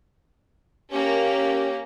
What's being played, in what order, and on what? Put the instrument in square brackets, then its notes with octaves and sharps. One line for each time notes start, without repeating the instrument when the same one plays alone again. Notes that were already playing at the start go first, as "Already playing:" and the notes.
[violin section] A#3 C#4 [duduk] G4